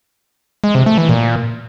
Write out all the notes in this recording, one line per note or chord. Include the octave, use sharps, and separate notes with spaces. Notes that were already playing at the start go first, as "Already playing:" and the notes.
G#3
C3
A3
E3
A#2